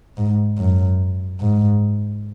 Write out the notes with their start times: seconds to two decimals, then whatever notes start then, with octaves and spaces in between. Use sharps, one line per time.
0.17 G#2
0.58 F#2
1.41 G#2